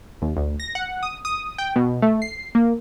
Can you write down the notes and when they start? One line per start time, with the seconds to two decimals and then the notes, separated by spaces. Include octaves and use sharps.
0.22 D#2
0.37 D2
0.60 A#6
0.75 F#5
1.03 D#6
1.25 D#6
1.58 G5
1.76 B2
2.02 A3
2.22 C7
2.55 A#3